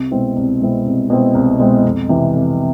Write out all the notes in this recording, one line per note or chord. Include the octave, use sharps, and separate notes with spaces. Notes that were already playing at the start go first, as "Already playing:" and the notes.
Already playing: C2
B2 G#3 C4 E4
C2
B2 G#3 C4 E4
C2
B2 G#3 C4 E4
C2
B2 G#3 C4 E4
F2
C3 E3
F2